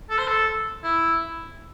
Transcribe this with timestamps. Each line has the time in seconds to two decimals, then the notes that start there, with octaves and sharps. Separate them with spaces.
0.10 A4
0.18 C5
0.28 A4
0.84 E4